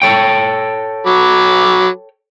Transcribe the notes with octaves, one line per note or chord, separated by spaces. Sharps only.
A4 C#5 G5
F#3 B5 D6